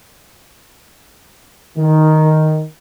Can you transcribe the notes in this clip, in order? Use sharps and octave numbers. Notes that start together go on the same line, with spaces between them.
D#3